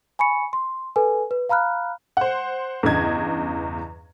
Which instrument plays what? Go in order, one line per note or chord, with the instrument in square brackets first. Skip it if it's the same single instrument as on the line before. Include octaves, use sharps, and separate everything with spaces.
[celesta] G#5 B5 C#6 C#7
C6
A4 B4 G#5
B4
F5 A#5 B5 F6 F#6
[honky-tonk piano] C5 F#5
E2 G2 C#3 D#5 G#6